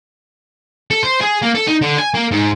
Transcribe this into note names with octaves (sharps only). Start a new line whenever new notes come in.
A4
C5
G#4
A#3
A4
D#4
D3
G#5
A#3
G#2